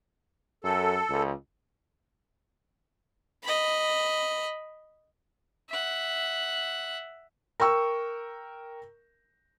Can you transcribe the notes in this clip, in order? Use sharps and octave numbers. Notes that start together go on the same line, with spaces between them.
F#2 A4
C#2
D#5 B5
E5 F#5
A#4 G5 C#6 E6